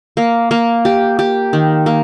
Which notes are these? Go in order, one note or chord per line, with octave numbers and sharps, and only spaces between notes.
A#3
A#3
G4
G4
D#3
A#3